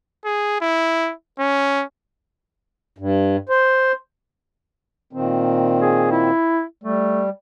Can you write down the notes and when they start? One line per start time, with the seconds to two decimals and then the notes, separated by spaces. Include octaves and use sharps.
0.25 G#4
0.61 E4
1.39 C#4
2.98 G2
3.49 C5
5.13 A#2 D#3 C4
5.82 G#4
6.11 E4
6.83 G3 A3